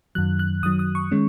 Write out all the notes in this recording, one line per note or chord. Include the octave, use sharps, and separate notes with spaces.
F#2 D#3 F#3 F#6
F#6
F#2 D#3 F#3 D#6
D#6
C#6
D#3 G#3 C#4